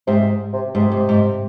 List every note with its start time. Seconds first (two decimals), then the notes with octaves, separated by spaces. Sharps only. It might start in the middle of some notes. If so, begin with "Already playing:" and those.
0.07 G#2 C3
0.53 C3
0.75 G#2 C3
0.92 G#2
1.09 G#2